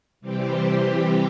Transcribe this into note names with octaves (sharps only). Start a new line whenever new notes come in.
C3 E3 G3 C4 G4